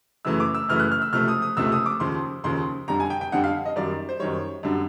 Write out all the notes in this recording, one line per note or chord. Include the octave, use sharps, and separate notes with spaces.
F#2 C#3 E3 A3 E6
D6
E6
F#2 C#3 E3 A3 F6
F#6
F6
E6
C#2 C3 F3 A3 F6
D#6
D#6
C#2 C3 F3 A3 E6
D#6
D6
D#2 C#3 F3 C6
D#2 C#3 F3 C6
F2 D3 G3 A#5
G#5
G5
G5
F2 D3 G3 F#5
F5
D#5
F#2 D#3 G3 D5
C5
F#2 D#3 G3 C#5
F#2 D3 G3